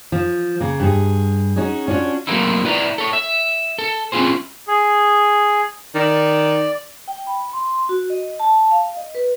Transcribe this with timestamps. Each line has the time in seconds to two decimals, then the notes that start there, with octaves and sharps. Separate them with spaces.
0.12 F3
0.61 C#3 A#3
0.80 G2 G#4
1.56 C#4 D#4 F#4 G#4
1.88 C#4 D4 F4 F#4
2.27 F#3 A3 A#3 C4 D#4 E4
2.65 E4 B4 D5 E5 A#5
2.98 A4 C#5
3.13 E5
3.78 A4
4.12 C4 C#4 E4 F4 G#4 C5
4.68 G#4
5.95 D#3 D5
7.08 G5
7.27 B5
7.53 C6
7.89 F#4
8.10 D#5
8.40 A5
8.71 F5
8.97 D#5
9.15 B4